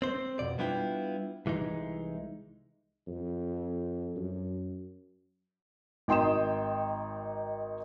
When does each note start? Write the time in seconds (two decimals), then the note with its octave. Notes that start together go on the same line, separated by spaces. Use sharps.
0.02 C4 C5
0.39 F2 B2 D5
0.58 G3 B3 D4 E4 F4 G5
1.46 C2 E3 G#3 D#4
3.07 F2
4.16 F#2
6.08 G#1 D#4 G5 C6 D#6 E7